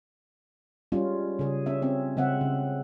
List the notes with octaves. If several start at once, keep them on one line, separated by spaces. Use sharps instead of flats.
G3 G#3 C#4 F4
C#3 G#4
C#4 E5
C4 C#4
C#3 G#3 C4 E5 F#5
C#3